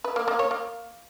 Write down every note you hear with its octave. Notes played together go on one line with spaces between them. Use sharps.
B4
A#3
A#3
C#5
A#3